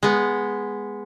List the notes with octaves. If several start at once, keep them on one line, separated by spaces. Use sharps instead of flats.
G#3 B3